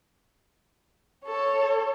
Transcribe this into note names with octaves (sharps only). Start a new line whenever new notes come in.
A4 C#5